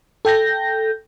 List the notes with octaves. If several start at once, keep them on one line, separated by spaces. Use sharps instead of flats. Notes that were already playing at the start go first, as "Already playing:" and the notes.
A4 G5 G6 A#6